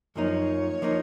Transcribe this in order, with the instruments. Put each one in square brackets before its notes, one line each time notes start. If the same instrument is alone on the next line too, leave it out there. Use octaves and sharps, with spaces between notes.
[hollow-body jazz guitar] F#2 F3 A#3 D#4 [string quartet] C#5
[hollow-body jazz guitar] F3 A#3 D#4